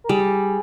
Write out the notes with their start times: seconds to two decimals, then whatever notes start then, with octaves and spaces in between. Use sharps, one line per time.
0.04 A#4
0.09 G3 G#4